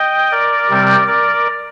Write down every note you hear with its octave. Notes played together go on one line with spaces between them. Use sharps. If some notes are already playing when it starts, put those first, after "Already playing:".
Already playing: D#5 G5
A#4 D5
C3 G3 C4
A#4 D5